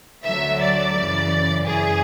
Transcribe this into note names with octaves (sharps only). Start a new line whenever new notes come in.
D2 D3 F#3 E5
D5
F#2 C#3 E3
F#2 E3 G#4